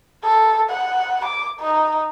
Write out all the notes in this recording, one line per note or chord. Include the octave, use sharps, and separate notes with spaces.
A4
F#5
D6
D#4